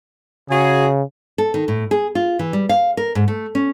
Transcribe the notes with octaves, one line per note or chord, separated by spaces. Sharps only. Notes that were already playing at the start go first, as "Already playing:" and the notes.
C#3 F#4 G#4
A4
D#3
A2
G#4
F4
E3
G3
F5
A#4
G#2
A3
C#4